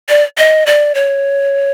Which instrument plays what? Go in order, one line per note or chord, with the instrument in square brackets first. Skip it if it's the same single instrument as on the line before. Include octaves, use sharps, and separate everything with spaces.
[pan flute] D5
D#5
D5
C#5